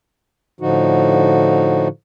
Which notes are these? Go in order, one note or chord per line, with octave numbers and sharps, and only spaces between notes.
A2 D3 F3 D#4 F#4